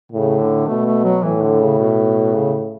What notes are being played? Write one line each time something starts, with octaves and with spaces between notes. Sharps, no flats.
A2 C#3
D3
B2 A3
A3
F#3
A2 E3
D3
C#3
B2
C#3